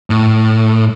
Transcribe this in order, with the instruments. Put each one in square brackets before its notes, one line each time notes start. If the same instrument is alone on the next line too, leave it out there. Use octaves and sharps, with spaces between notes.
[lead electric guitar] A2